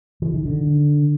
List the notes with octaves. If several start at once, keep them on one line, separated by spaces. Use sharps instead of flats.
E3
D#3
D3